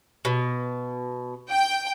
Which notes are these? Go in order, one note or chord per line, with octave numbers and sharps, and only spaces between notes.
B2
G5